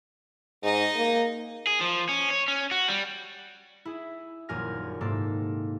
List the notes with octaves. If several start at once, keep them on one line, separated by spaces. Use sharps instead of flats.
G#2 D#4 D#5
A#3
G#4
F3
C#4
C#5
C#4
F#4
G3
E4 G#4
D#1 A#1 F#2 G#5 F6 A#6
G#2 C3 A#3 A4 C7